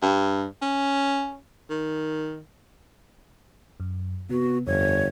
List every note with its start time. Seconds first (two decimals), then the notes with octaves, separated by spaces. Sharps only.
0.02 G2
0.62 C#4
1.70 D#3
3.80 F#2
4.30 C3 B3 F#4
4.67 G1 F2 C#5